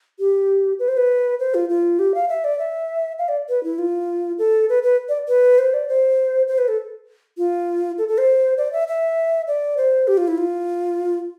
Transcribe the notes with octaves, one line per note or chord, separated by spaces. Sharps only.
G4
B4
C5
B4
C5
F4
F4
G4
F5
E5
D5
E5
F5
D5
B4
E4
F4
A4
B4
B4
D5
B4
C5
D5
C5
C5
B4
A4
F4
A4
A4
C5
D5
E5
E5
D5
C5
G4
F4
E4
F4